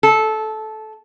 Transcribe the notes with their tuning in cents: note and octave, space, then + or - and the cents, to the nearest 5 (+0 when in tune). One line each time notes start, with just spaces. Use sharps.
A4 -15